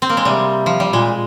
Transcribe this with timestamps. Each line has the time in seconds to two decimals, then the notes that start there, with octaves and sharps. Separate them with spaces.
0.02 C4
0.09 A#3
0.17 G#3
0.25 C3 G3
0.66 F3
0.80 G3
0.93 A#2 G#3